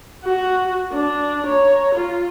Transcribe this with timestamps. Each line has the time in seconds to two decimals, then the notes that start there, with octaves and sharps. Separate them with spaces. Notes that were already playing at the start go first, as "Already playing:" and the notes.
0.24 F#4
0.93 D4
1.46 C#5 A#5
1.95 F4